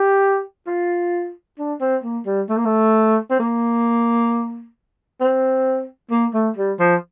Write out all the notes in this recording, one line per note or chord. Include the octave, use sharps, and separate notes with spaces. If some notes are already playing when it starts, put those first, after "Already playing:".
Already playing: G4
F4
D4
C4
A#3
G3
A3
A#3
A3
C4
A#3
C4
A#3
A3
G3
F3